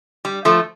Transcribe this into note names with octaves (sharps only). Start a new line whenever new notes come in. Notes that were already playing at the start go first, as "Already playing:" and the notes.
G3
F3 A3